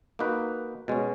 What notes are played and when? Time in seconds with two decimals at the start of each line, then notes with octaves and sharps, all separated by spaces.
0.19 A#3 D#4 F#4 B4
0.88 B2 G#3 C#4